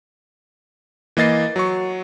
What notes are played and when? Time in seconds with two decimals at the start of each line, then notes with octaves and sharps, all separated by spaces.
1.17 E3 A#3 D#5 A6 C7
1.56 F#3 C#6